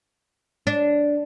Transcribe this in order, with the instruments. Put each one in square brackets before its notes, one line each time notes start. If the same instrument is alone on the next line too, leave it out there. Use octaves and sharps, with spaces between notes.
[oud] D4